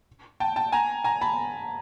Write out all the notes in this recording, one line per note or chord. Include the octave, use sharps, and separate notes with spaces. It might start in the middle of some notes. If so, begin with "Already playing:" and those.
G5 A5
G5 A5
G#5 A#5
G#5 A#5
A5 B5